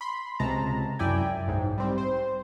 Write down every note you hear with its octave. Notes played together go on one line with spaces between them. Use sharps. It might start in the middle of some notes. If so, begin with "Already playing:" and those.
B5 C6
C#2 C3 G#3 A5 A#5
F#2 E4 D5 G5 G#5
B1 G#2
G3 C4
C5